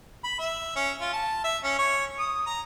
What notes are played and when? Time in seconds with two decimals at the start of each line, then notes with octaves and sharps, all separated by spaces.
0.24 B5
0.39 E5
0.76 C#4
1.01 F4
1.13 A5
1.44 E5
1.64 C#4
1.79 C#5
2.19 D#6
2.46 A#5